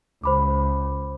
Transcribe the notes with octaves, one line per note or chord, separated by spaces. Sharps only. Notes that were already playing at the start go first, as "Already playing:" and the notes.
C#2 C5 B5 D6